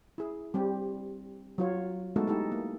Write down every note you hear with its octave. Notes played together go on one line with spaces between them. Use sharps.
E4 G#4
G3 C4 G4
F#3 F4 C#5
G#3 A3 B3 D#4 F#4 A4
D#4 E4 G4 A4
A#3